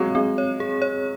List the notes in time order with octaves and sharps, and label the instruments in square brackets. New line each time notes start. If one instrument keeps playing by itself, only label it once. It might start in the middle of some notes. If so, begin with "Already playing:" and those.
Already playing: [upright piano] F#3 G#3 [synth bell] C4 C#5
[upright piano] G#3 [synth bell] C4
[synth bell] C#5
G#4
C#5